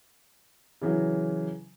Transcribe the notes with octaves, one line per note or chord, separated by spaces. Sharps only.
C#3 E3 F#3